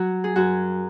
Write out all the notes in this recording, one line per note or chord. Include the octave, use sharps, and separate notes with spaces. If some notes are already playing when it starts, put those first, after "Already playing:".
Already playing: F#3 F#4
G#4
F#2 F#4